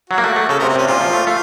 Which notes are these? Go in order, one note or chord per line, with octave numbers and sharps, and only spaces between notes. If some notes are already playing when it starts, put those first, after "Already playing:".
F#3 F#4
A#3
A3
A3
C#3 A4
C3 A#4
C4
C3 C#4
A#2 F4
F3
A3
A3 F4